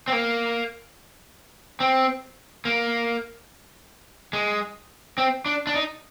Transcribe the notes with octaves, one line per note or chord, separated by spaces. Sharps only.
C4
A#3
C4
A#3
G#3
C4
D4
D4
D#4